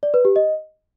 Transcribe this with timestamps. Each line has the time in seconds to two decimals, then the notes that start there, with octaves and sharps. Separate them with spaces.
0.03 D5
0.14 B4
0.25 G4
0.36 D#5